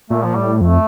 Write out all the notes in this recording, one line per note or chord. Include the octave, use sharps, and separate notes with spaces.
A#2 A3
F3
A2 G3
F2 A3